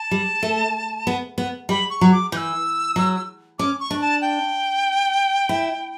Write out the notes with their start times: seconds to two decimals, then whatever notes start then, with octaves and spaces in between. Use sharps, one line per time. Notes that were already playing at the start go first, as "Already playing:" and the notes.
Already playing: A5
0.11 G3
0.43 A3
1.07 B3
1.38 B3
1.69 G3 B5
1.90 C#6
2.01 F#3
2.12 D6
2.32 E3 G6
2.37 E6
2.96 F#3
3.59 C#4 D6
3.80 C#6
3.91 D4
4.01 A5
4.22 G5
5.49 E4